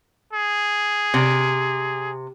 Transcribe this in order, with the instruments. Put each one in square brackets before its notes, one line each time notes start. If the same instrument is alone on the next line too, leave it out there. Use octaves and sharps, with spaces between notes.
[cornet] G#4
[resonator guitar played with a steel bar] C3